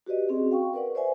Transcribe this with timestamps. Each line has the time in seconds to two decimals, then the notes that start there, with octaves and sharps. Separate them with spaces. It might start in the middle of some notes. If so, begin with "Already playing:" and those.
0.06 F#4 G4 B4 D5 D#5
0.29 C4 C#4 F#4 G#4
0.51 F5 G5 C#6
0.73 A#4 B4 D5 F#5
0.94 B4 C5 D5 E5 G#5